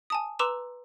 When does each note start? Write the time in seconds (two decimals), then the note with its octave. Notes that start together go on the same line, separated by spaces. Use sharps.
0.10 G#5 A5 D#6
0.39 B4 A#5 C6 D6 E6 E7